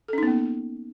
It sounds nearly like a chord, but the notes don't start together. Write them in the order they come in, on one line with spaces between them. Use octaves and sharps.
A4 C#4 D#4 B3 A#3